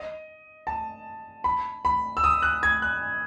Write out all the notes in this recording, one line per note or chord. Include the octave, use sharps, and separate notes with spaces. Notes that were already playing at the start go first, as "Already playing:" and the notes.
Already playing: D#5
A5
B5
B5
E6
D#6
F#6
G#6
F#6